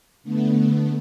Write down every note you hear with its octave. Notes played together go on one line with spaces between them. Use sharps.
D3 A3 B3